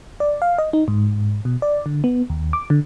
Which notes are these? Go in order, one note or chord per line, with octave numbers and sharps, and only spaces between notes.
D5
F5
D#5
D#4
G#2
B2
D5
D3
B3
D#2
D6
D3